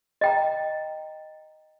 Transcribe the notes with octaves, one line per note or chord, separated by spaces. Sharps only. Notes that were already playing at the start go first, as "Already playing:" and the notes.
D#5 G5 A#5